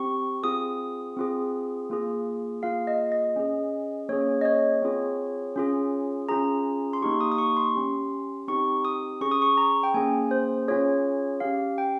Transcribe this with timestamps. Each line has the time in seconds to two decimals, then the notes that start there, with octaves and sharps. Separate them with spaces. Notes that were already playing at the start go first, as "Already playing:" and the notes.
Already playing: C4 G4 C#6
0.43 C4 F4 G#4 D#6
1.17 C4 F4 G#4
1.90 A#3 F4 G#4
2.62 A#3 F4 G#4 F5
2.87 D#5
3.12 D#5
3.36 C#4 G#4
4.09 A#3 C#4 G#4 C#5
4.41 D#5
4.45 C#5
4.82 C4 F4 G#4
5.56 C#4 F4 G#4
6.29 C#4 F4 G#4 A#5
6.93 C6
7.01 A#3 D#4 G4 C#6
7.21 D#6
7.32 D#6
7.38 C#6
7.57 C6
7.75 C#4 G4
8.48 C4 D#4 G4 C#6
8.85 D#6
9.21 C#4 G#4 C#6
9.31 D#6
9.42 C#6
9.57 A#5
9.83 G5
9.94 A#3 C#4 G#4 G#5
10.31 C5
10.68 C#4 F4 G#4 C#5
11.40 C#4 G4 F5
11.78 G5